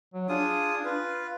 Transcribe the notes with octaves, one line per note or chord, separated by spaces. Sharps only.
F#3
D4 F4 G#4 D#6
F4 B4